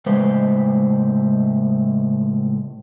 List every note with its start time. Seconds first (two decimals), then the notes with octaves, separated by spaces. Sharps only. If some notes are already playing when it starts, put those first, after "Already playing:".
0.06 A2 C#3 G#3 B4 C5